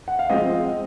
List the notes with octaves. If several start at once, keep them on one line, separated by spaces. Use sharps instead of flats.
F#5
F5
F3 G#3 C4 D#5